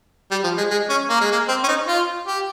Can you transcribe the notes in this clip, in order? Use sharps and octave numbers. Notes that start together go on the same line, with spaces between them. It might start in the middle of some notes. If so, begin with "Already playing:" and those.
G3
F3
G#3
G#3
C#4
A#3
G#3
A#3
C4
C#4
D#4
F4
G4